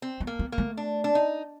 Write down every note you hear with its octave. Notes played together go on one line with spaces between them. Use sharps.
C4
B3
A#3
B3
A#3
A3
D4
D4
D#4